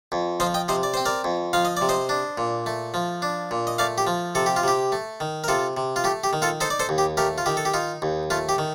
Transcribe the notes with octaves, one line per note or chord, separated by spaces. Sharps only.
F2
F3 C5 D#5
D#5 G5
C3 C5 D#5
D5
C4 C5
A#4 D5
F2
F3 F5
D#5
C3 D5
C5 D#5
D4
A#2
A3
F3
D4
A#2
D#5
A3 D5 F5
G4
F3
C3 A4
G4
F4
C3 G4
A3
D#3
A#4
C3 F4 A4
C3
F4
A3 G4
G4
D#3
F4 A4
D#4 A4 C5
D5
A4 C5
D#2
G4
A3 G4 A#4
F4
D#3 G4
A4
G4
D#4 F4
D#2
A3 F4
G4
D#3